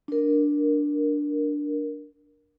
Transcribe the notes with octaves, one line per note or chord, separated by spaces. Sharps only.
D4 A#4